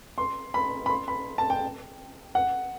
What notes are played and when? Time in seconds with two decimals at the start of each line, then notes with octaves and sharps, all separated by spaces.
0.18 C6
0.54 B5
0.86 B5
0.90 C6
1.08 B5
1.38 A5
1.50 G5
2.35 F#5